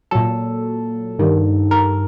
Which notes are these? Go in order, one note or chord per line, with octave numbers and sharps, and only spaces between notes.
A#2 F#3 A4
G2 D#3 G3
A#4